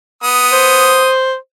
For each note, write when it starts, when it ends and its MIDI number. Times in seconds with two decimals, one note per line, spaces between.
0.23 1.10 59
0.23 1.10 87
0.52 1.36 72